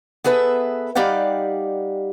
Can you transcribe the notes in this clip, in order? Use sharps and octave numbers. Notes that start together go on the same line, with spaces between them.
B3 G#4 A4 B4 E5
G3 D#4 G4 D5 F5 F#5